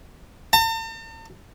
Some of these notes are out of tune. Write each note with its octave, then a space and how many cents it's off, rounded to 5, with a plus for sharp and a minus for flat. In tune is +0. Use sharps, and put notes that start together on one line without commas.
A5 +45